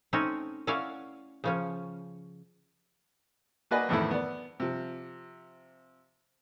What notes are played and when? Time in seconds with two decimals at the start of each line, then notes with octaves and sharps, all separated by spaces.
0.13 A3 C4 C#4 D#4
0.67 C#4 E4 C#5 D5 F5 F#5
1.44 C#3 F3 C#4
3.71 A#3 F#4 B4 D5 D#5 G#5
3.89 F2 A2 D#3 E3 A3 E4
4.11 B3 D5
4.60 C3 F3